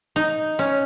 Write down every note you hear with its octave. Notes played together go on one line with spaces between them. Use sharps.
D#4
C#4